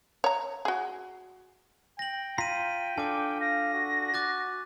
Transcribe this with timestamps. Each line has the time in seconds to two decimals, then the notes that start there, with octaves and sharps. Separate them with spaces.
0.24 C#5 A#5
0.65 F#4 G#4
1.99 G5 A#6 F#7
2.38 F4 A#5 B6 D#7
2.98 D4 F4 A4 G#5 D6
3.41 F5 A#6
3.74 F#4
4.14 D6 F#6 A6